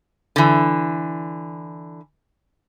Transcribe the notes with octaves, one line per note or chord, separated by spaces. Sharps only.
D3 E3